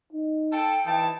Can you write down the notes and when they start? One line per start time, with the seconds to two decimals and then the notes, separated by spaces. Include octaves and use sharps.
0.13 D#4
0.52 A4 G5
0.86 C3 E3 D#4 E4 A5